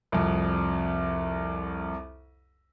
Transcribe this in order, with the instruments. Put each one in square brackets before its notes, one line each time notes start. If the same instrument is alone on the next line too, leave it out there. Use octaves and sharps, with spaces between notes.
[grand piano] C2 F2